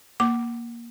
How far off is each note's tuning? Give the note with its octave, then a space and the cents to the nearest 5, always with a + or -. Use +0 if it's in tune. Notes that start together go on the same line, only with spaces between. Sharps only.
A#3 +10 D6 +0